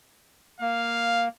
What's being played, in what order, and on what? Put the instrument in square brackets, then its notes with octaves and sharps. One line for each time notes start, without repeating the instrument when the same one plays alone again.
[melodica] A#3 [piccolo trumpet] F5